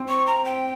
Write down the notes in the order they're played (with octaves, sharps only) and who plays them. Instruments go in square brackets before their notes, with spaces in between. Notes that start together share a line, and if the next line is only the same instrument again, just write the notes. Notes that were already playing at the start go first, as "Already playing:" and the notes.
Already playing: [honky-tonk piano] C4
[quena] C#6
A#5
G5